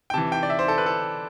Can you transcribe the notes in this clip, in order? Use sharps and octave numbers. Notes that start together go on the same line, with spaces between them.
G5
C3 E3 A5
G5
D5
E5
C5
A4
B4
A4